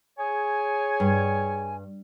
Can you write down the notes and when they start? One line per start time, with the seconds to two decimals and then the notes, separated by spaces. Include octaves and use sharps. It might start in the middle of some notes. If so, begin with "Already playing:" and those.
0.18 G#4 C#5 G#5
1.00 G2